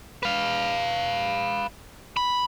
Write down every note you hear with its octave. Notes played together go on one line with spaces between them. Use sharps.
B4 F5
B5